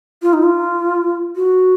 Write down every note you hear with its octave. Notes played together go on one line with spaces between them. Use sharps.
F4
D#4
F4
F#4